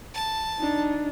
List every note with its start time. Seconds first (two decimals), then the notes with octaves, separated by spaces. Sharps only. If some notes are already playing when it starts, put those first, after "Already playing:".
0.14 A5
0.58 D4 D#4